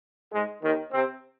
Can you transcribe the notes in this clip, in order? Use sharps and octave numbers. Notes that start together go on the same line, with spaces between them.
G#2 G#3
D#2 D#3
C3 C4